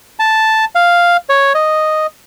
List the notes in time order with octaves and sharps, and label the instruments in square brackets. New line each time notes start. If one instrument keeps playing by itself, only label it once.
[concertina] A5
F5
C#5
D#5